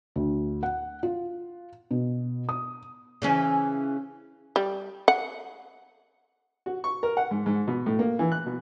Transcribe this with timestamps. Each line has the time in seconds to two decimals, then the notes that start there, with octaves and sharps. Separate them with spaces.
0.16 D2
0.63 F#5
1.03 F4
1.91 B2
2.49 D#6
3.22 C#3 E3 C#4
4.56 G3
5.08 F#5
6.66 F#4
6.84 C#6
7.03 A#4
7.17 F#5
7.31 G#2
7.46 G#2
7.68 B2
7.86 A2
7.99 A#3
8.19 E3
8.32 F#6
8.46 B2